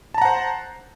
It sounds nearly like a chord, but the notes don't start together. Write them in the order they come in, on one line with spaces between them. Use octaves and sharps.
A5 A#5 F#5 C5